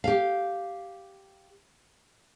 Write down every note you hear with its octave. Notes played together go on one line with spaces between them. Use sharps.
G4 F5